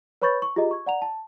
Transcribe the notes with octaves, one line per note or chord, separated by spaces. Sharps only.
B4 C#5 B5 C#6 G6 A6
C#6
F4 G4 G#4 D#5 A#5
C#6 G#6
D5 F#5 A#5 F7
A5